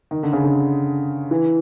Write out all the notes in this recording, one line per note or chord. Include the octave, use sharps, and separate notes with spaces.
D#3
D3
C#3
D3
E3